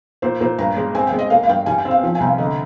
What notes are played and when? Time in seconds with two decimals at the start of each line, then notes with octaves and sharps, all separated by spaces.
0.22 A#2 C5
0.41 A#2 C5
0.58 G2 A#5
0.76 G#3
0.95 C4 G#5
1.07 G5
1.12 G#3
1.19 D#5
1.30 A#3 F5
1.43 F5
1.48 G2 G5
1.66 G3 G#5
1.78 G5
1.85 C4
1.91 F5
2.03 F3
2.15 G#5
2.20 C2 G5
2.27 F5
2.38 D3 D#5